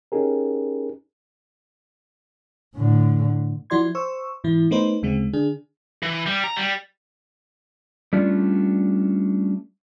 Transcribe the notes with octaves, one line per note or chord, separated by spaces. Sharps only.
C#4 D#4 G4 G#4 A#4
A2 D3
F3 E4 F#4 D5 C6 G#6
C5 C#6 E6
G#2 E3 E4
A3 B3 D#4 B4 C5
D2 C#3 G#3 C4
D3 D4 G#4
E3
G3
A#5
G3
G3 A3 C#4 D4 F4